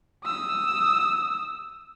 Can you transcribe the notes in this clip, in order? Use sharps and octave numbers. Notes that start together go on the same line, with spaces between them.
D#6 E6